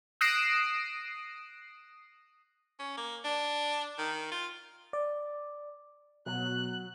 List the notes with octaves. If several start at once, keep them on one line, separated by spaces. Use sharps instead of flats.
D#6 F#6 A#6 C7 D7 E7
C#4
A#3
D4
D#3
F4
D5
B2 F#3 F#6